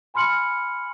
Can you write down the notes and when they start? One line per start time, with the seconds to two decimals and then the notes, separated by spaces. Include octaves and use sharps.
0.14 G#5 B5 C6 F6 C#7 F#7